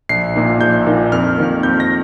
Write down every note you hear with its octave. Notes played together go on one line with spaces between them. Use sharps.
A#1 C7
A#2 A#3 D#4
A#1 G6
A#2 A#3 D#4
F2 F6
D#3 A#3
F2 G6
A#6